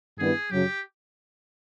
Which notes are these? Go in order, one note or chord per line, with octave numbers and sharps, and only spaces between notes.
G2 D#3 G3 B3 E4 G#4
F#2 C#3 F#3 G4